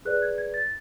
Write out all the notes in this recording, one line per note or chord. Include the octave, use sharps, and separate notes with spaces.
G#4 B4 D5 F#6
G#6
G#6
A6